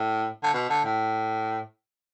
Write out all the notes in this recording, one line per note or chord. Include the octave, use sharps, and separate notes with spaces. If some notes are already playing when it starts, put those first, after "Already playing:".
Already playing: A2
D3
B2
D3
A2